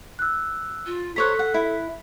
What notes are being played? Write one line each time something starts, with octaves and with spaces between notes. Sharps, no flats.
E6 F#6
F4
A4 C5 C#5 A#5 F#6 B6
F#5
E4